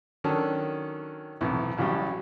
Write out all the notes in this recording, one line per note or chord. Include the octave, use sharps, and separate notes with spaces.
D#3 F#3 C#4 D4 A4
B1 E2 A2 C3
A1 A2 C#3 F#3 G3